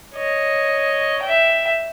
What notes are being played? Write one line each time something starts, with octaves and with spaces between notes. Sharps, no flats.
C#5 D#5
E5 G5